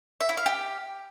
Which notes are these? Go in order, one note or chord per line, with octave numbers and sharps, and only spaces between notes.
E5
E4
F5
G4